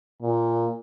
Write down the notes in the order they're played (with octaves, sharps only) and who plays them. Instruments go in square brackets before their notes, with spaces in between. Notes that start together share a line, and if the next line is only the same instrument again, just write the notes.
[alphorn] A#2